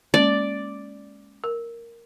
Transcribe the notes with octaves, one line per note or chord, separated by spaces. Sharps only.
G#3 A#3 C#4 D5
A#4